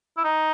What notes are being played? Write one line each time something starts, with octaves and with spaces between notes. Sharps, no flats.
E4
D#4